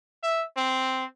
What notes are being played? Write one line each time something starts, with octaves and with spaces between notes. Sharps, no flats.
E5
C4